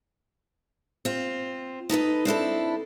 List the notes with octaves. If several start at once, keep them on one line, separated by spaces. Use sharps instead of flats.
C4 F4
D#4 A4 B4 D#5
C4 D4 E4 A4